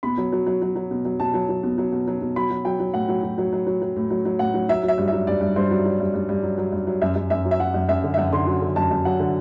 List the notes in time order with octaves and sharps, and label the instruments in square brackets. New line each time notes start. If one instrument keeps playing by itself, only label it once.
[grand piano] B2 B5
F#3
F#3
F#3
F#3
F#3
B2
F#3
B2 A5
F#3
F#3
B2
F#3
B2
F#3
B2
F#3 B5
F#3
F#3 G5
F#3
A2 F#5
F#3
F#3
F#3
F#3
F#3
F#3
A2
F#3
F#3
A2 F#5
F#3
F#3 E5
F#3
E5
G2
E5
F#3
G2 D5
G2
G2 C5
F#3
F#3
G2
G2
G2
F#3
F#3
G2
F#3
F#2 E5
F#2
F#2 E5
F#3
E5
F#3 F#5
F#2
F#2 E5
D3
E5
F#2 F#5
D3 C6
F#3
D3
F#2 A5
F#2
F#3 F#5
D3